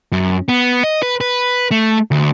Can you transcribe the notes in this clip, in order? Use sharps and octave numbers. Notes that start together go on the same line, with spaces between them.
F#2
B3
D#5
B4
B4
A3
D2